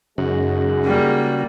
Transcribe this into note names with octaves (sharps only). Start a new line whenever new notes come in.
F#2 C#3 G#3 D#4 F#4 G#4
G3 A#3